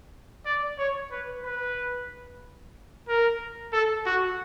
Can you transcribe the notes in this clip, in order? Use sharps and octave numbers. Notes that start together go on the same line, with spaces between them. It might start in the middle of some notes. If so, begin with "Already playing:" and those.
D5
C#5
B4
B4
A#4
A4
F#4